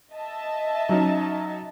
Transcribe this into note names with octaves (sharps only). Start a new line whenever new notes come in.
D#5 E5 A5
F#3 C#4 D#4